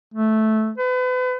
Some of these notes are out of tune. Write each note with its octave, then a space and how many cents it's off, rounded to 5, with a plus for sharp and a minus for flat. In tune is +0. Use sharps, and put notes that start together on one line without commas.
A3 -10
B4 +35